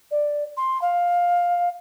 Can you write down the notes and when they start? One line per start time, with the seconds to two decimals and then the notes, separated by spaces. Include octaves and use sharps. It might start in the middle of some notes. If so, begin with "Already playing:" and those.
0.11 D5
0.57 C6
0.82 F5